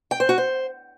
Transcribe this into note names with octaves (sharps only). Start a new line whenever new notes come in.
G5
C5
F#4
C5